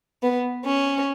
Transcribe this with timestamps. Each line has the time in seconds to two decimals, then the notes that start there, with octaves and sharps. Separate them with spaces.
0.23 B3
0.65 C#4